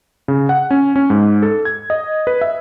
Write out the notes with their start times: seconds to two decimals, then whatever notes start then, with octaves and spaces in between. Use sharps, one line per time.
0.28 C#3
0.49 F#5
0.71 C#4
0.96 C#4
1.10 G#2
1.42 A4
1.65 G#6
1.90 D#5
2.27 B4
2.41 E5